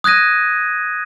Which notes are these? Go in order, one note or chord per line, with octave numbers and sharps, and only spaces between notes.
D#6 F#6 G#6 A#6 D#7